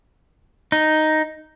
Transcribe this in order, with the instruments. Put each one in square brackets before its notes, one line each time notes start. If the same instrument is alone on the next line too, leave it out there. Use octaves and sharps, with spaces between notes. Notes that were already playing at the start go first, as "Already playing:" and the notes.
[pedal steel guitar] D#4